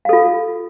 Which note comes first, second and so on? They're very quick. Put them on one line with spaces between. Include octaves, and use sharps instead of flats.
F5 A4 F4